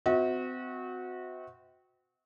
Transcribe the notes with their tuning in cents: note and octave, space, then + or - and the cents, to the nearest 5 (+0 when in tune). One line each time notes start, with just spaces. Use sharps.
C4 -35 F#4 -15 E5 -45